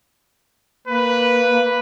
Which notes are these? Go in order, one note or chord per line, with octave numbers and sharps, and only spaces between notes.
A#3 B4